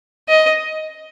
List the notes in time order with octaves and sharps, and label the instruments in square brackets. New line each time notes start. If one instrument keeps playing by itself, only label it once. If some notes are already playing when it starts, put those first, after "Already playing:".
[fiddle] D#5